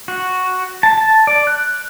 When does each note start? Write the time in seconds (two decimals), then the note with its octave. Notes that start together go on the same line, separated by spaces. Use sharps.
0.08 F#4
0.83 A5
0.98 A5
1.27 D5
1.47 F#6